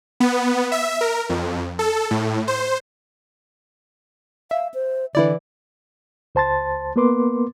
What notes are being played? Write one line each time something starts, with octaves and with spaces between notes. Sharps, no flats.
B3
E5
A#4
F2
A4
A2
C5
E5 F5
C5
D3 E3 E4 D5
C#2 C5 A5 C6 A6
A#3 B3 A#4 B4 C6 D6